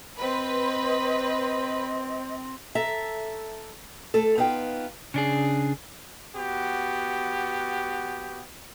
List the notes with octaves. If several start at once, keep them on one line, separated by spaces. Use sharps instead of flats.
C4 B4 C5 D#5
A4 E5 A#5
A3 A4
B3 D#4 F4 G5
C#3 D4 G#4
B3 F#4 G4